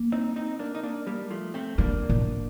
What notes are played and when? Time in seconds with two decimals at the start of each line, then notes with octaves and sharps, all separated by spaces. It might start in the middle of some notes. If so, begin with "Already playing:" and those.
Already playing: A#3
0.12 C4 D#4
0.36 C4 D#4
0.59 A#3 D4
0.75 D#4
0.83 A#3 D4
1.07 G3 A#3
1.30 F3 A3
1.54 A3 C4
1.78 G3 A#3 D4
2.09 A2